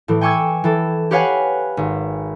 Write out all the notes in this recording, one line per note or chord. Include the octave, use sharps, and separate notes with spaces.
A2 E3
G5 G#5 C#6 D6 E6 G#6
E3 A4
G4 B4 C#5 F5 F#5 G#5
G#1